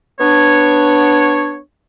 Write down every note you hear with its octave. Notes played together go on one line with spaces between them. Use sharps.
B3 D4 C#5